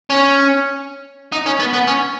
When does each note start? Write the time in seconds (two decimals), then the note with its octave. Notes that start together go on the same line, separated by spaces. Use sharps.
0.10 C#4
1.33 D#4
1.46 C#4
1.59 B3
1.73 B3
1.87 C#4